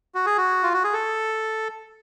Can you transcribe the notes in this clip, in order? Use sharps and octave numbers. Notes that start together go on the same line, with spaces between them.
F#4
G#4
F#4
F4
F#4
G#4
A4